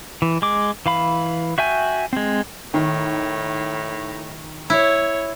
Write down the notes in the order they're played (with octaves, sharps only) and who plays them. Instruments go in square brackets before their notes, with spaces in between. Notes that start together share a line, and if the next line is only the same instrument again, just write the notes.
[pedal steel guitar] E3
G#3 D6
E3 F5 B5
F#4 E5 G5 G#5
G#3 C4
[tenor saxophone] A2 [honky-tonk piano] D#3
[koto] E4 [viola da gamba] C#5